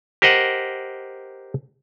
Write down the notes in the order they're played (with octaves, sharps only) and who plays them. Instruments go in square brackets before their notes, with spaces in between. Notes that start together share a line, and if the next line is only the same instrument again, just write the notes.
[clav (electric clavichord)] G4 A#4 C5 D#5 F#5